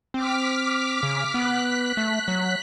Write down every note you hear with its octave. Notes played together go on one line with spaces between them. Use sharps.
C4 D6 F6 B6
C#3
B3 F#6 B6
A3
F#3